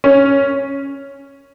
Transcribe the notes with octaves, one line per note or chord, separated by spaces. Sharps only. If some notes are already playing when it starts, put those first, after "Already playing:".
C#4